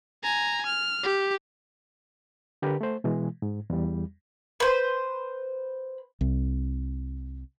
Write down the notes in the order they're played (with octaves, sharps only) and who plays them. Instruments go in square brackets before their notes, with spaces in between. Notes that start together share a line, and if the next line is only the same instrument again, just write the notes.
[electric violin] G#5 A#5
F6
G4
[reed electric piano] D3 G4 A#4 B4
A3 C5
B2 E3 G#3
G#2
E2 G3
[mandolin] B4 C5
[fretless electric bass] C2